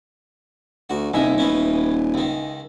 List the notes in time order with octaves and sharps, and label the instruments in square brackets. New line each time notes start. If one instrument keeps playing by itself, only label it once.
[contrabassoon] D2 [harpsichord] F#4
[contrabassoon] D#1 [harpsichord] C2 G2 E5 [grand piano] D#4 E4 G#5
[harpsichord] E3 B3 C#4
C#2 D#3